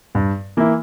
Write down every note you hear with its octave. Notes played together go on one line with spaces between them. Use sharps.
G2
E3 A#3 E4